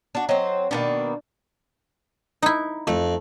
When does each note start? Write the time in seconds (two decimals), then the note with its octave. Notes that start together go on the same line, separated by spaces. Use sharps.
0.15 D4 F#4
0.29 F#3 C4 D#5
0.71 B2 D#3 A#3 D4
2.42 D#4 E4
2.87 F2 A3